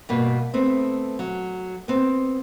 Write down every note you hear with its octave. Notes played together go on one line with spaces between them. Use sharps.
G2 B2 A#3
A3 B3 C4
F#3
B3 C4